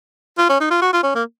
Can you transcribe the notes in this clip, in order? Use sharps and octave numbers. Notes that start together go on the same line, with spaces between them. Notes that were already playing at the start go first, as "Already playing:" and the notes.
F4
C#4
D#4
F4
F#4
F4
C#4
A#3